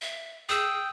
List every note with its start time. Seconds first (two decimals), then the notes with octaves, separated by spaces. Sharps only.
0.02 E5
0.49 G#4 G5 D#6 E6